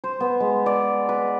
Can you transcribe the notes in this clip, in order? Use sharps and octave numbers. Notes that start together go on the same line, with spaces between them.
C5
B3
G#3
D5
B4